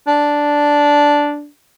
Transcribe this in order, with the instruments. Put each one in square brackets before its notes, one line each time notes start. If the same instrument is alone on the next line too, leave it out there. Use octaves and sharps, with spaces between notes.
[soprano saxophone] D4